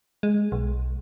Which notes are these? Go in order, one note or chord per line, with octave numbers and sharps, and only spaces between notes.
G#3
B1